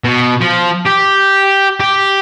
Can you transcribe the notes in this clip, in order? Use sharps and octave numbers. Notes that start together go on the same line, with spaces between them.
B2
F3
G4
G4